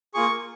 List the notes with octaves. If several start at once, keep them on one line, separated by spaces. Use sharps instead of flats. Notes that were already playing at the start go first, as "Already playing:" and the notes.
A#3 F4 G#4 C#6